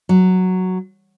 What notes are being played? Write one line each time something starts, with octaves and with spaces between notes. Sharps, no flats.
F#3